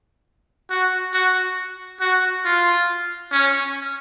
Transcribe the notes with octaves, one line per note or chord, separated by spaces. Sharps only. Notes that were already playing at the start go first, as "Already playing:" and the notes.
F#4
F#4
F#4
F4
C#4